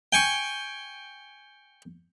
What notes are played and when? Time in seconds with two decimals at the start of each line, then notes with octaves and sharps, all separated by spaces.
0.13 G5 G#5 C#6